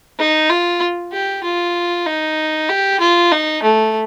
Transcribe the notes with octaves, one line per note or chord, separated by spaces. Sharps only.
D#4
F4
G4
F4
D#4
G4
F4
D#4
A3